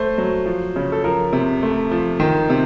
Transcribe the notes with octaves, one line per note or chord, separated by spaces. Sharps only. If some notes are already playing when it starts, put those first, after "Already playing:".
Already playing: A3 C5
F#3
F3
C#3
A4
F3 A#4
C3
A3
F3
D#3
C3